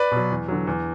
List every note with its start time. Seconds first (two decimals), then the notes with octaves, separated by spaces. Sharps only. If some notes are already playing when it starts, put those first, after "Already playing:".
Already playing: B4 D5
0.11 B2 F#3
0.31 E2
0.48 D3 F#3
0.67 E2